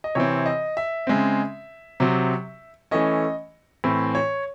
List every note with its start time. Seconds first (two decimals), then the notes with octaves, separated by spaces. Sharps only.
0.04 D#5
0.15 C3 E3 C4 C#5
0.46 D#5
0.77 E5
1.07 C#3 G#3 C4
2.00 C3 F#3 C4
2.91 E3 A3 C#4 D#5
3.84 A2 E3 C4
4.15 C#5